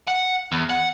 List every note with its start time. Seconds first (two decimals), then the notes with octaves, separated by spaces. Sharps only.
0.08 F#5
0.52 E2
0.70 F#5